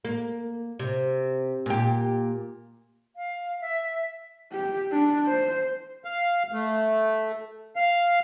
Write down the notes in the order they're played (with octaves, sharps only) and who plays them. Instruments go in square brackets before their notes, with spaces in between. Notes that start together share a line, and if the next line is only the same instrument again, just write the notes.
[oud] A#3
C3
A#2 G4
[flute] F5
E5
[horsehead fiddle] G4
D4
C5
[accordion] F5
A3
F5